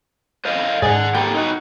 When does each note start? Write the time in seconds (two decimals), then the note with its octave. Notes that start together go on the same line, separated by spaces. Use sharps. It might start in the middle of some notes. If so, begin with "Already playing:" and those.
0.45 C5 D#5 F5
0.82 G#2 D5 F#5 G#5
1.15 A#3 G4 A4 G5
1.34 D#4 F#4